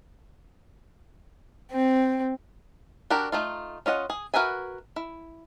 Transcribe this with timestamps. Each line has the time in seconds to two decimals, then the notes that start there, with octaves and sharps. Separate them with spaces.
1.71 C4
3.10 D4 F#4 G4 A#4
3.32 A3 D#4 F4
3.86 C#4 F4 D#5 F#5
4.10 G#4
4.34 F#4 A#4 B4 E5 G#5
4.96 E4